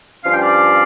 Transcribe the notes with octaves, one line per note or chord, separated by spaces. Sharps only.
G2 F3 C#4 F5
G5
D5 F5